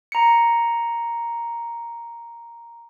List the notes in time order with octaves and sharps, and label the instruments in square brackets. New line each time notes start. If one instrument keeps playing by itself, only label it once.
[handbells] A#5 C#7